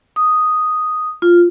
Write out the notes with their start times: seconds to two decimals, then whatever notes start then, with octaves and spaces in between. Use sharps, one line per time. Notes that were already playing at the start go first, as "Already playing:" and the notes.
0.16 D#6
1.22 F4